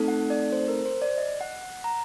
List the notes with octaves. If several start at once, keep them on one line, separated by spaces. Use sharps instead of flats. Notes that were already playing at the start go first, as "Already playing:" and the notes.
Already playing: A3 C4 D#4 A4
F#5
D5
C5
A#4
C5
D5
D#5
F#5
F#5
A#5